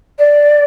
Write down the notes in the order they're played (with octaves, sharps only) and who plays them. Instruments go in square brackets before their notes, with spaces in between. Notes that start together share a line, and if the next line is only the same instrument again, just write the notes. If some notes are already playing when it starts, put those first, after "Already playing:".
[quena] D5